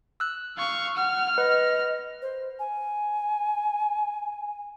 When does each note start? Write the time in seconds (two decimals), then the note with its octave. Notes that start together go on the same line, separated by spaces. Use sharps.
0.20 E6 F#6
0.58 F5 C#6
0.97 F#5 F6
1.38 B4 D#5
2.22 C5
2.59 G#5